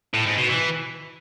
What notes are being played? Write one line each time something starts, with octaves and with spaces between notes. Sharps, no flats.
A2
G#2
B2
E3